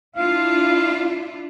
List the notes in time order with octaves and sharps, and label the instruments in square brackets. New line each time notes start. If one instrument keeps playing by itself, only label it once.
[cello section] D4 E4 F4 [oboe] F5